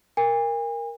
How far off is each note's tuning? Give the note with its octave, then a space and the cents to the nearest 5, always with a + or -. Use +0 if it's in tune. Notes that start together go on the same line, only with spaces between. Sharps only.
A#4 +0 G#5 -40